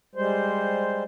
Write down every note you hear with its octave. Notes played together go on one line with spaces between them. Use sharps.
G3 G#3 C5